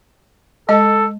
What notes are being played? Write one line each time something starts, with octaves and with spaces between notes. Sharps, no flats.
G#3 A4 D#5 A5